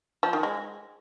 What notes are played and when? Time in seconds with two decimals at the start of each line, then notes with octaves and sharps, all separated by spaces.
0.23 F3
0.33 D#3
0.43 G#3